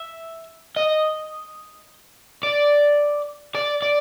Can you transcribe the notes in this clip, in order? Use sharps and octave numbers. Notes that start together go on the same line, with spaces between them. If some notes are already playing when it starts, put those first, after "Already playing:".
Already playing: E5
D#5
D5
D5
D5